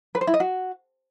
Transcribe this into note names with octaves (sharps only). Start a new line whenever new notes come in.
B4
C5
E4
D#5
F#4